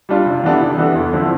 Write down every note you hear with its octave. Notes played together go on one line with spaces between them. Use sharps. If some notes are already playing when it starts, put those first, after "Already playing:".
G3 D4 F4
C3
E3 B3 D4 A4
C3
E3 B3 D4 A4
E2
D3 F3 C4 E4